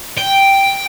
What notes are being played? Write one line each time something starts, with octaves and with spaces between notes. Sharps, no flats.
G5